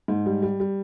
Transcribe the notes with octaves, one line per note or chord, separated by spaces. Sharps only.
G#2
G3
G3
G3